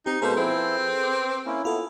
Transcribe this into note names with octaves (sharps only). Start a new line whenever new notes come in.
C4 D#4 G4
B2 G#3 A#3 G#4 A4 B4 C5
F3 C4 E4
D6
A#3 C#4 E4
B3 E4 F4 A4